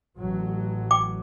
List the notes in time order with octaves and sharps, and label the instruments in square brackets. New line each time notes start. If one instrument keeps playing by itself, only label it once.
[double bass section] A1 F#3
[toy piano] G5 D6